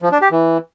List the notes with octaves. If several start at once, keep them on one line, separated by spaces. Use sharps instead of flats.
F3
D4
G4
E3